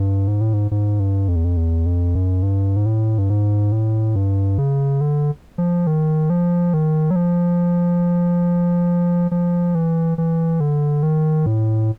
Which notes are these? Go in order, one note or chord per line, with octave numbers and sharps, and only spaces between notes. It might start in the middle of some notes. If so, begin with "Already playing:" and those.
Already playing: G2
G#2
A2
G#2
G#2
G2
F2
E2
F2
E2
F2
F#2
G2
G#2
A2
G2
G#2
A2
G2
C#3
D3
F3
D#3
F3
D#3
F#3
F3
F3
E3
E3
D3
D#3
A2